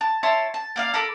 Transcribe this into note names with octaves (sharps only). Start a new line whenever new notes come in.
A5
E4 C#5 A5 C6
A5
A#3 D5 F5
A4 A#4 B5 D6